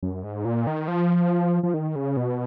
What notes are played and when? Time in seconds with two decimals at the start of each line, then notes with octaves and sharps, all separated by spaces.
0.03 F#2
0.24 G#2
0.45 A#2
0.67 D#3
0.88 F3
1.63 F3
1.74 D#3
1.96 C#3
2.17 B2